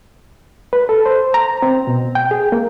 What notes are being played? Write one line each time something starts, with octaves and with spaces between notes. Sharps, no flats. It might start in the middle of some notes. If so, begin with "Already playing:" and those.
B4
A4
C5
A#5
C4
B2
G5
G#4
A#3